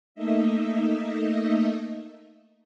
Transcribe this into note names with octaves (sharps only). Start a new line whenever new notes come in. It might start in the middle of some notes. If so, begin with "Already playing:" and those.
A3 A#3 D#4 D#5 E5